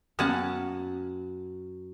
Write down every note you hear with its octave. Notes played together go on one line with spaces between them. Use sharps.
F#2 A#3 B3 F#4 F#5 A5